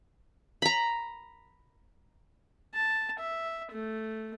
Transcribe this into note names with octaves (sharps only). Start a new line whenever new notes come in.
A#5 B5
A5
E5
A3